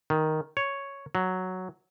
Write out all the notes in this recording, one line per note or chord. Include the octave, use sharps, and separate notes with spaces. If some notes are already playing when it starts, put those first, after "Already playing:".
D#3
C#5
F#3